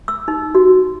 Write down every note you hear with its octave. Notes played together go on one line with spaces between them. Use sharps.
E6
D#4
F#4